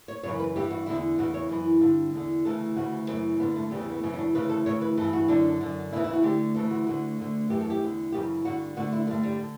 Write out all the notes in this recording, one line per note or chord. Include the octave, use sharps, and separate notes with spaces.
C#5
F#2 C#3 E3 C#5
B4
G2 E3 G4
F#4
E2 D3 E4
E2 C#3 E3 F#4
C#5
F#2 E3
G2 D3
E2 D3
D2 C#3 E3 A4
D2 C#3 E3 F#4
F#2 C#3 E3
G2 D3 B3
A3
E2 C#3 E3 G3
G3
B3
F#2 C#3 E3 C#4
C#4
D4
D2 C#3 E3 B4
A4
D2 C#3 E3 C#5
B4
G2 E3 A4
F#4
F#2 D3 D4
F#2 D3
E2 C#3 E3 E4
E4
F#4
D2 D3 G4
D2 C#3 E3 A4
F#4
D2 D3 F#4
D2 D3
F#2 E3 G4
A4
G4
E2 D3
F#2 C#3 E3 G4
G2 D3 F#4
D2 D3 F#4
E4
G2 D3 A3
G3
D3